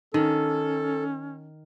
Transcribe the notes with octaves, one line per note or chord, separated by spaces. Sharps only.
D#3 C#4 A4